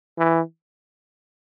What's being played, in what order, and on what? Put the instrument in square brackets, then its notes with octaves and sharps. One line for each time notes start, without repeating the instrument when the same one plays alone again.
[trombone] E3